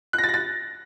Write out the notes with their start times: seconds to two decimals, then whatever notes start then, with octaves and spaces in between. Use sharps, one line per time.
0.13 F#6
0.18 A#6
0.24 A6
0.29 A#6
0.34 A6